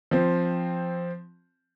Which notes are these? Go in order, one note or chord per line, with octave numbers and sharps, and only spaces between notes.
F3 C4